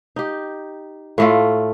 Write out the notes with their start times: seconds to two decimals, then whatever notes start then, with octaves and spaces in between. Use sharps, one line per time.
0.16 D#4 G4
1.18 A2 A3 F4